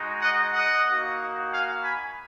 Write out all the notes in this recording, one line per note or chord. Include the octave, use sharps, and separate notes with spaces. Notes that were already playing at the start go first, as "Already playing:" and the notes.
Already playing: G#3 D#4 F#4
D#5 F#5
D#5 F#5
A#3 D#4 F#4
F5 G#5
G#5 B5